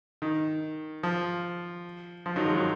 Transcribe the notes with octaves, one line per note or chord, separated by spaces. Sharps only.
D#3
F3
F3
D#3 F#3
F3 G#3
D#3 F#3